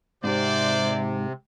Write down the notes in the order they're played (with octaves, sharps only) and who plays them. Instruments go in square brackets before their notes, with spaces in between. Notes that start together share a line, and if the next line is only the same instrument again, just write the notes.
[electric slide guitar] G#2 [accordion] C3 [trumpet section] C5 D5